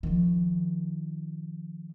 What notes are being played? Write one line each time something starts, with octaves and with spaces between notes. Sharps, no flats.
D#3 F3